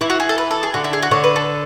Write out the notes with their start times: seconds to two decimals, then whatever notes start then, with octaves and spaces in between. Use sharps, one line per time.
0.01 E3 E4
0.10 F#4
0.20 G#4
0.29 A4
0.38 B4
0.51 A4
0.63 G#4
0.74 D3 F#4
0.84 E4
0.93 G#4
1.02 F#4
1.11 D3 C#5
1.24 B4
1.36 A4